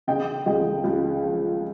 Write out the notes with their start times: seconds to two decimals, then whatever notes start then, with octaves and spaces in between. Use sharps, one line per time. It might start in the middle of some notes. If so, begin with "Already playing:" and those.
0.07 C#3 D#5 G5
0.46 C#2 D#5 G5
0.84 C#2
1.23 F3